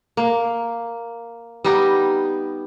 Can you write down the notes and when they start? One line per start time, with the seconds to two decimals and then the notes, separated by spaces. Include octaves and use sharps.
0.17 A#3
1.64 G3 B3 D#4 G4